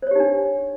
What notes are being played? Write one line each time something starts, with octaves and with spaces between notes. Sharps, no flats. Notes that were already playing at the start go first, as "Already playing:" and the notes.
D4 D#4 G4 C5 C#5